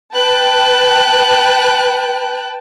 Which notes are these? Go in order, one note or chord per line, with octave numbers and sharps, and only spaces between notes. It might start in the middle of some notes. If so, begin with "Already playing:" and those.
B4 G5 A5 F#6